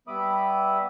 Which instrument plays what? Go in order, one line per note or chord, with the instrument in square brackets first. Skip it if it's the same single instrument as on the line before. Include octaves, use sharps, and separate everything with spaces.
[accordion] G3 B3 E5 B5 D6 D#6